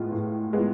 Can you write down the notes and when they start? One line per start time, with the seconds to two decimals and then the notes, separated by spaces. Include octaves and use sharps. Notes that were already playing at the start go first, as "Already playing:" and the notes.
Already playing: A2 G#3 B3 F4
0.12 A2
0.53 G#3 B3 F4